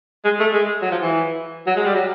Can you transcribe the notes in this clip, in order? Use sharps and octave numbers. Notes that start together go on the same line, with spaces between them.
G#3
A3
G#3
F#3
F3
E3
F#3
G#3
G3
F#3